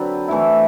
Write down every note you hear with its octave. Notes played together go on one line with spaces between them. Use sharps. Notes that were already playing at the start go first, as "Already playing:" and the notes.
Already playing: D3 F#3 C4 A4 B4
E3 A3 E4